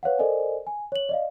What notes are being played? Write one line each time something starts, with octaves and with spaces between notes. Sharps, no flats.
B4 C#5 F5 F#5
A4 A#4 C5 D5 D#5 G#5
G#5
C#5 F#7
D5 D#5 F5